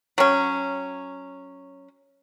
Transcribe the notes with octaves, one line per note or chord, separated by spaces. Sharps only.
F#3 C#4